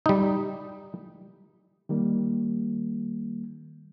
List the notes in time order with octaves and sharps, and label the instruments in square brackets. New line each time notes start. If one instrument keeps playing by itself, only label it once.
[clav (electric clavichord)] G3 D#4
[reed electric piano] D#3 G3 A#3